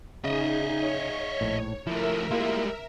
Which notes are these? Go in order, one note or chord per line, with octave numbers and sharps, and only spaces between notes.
C#3 D#4 G#4 D#5 E5
C#5
A#1 A2
F3 A3 E4 A#4 E5
G3 G#3 A#3 E4 F4